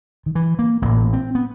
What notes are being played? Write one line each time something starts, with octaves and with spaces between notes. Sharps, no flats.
D#3
E3
A#3
A1 A2 A#3
C4
B3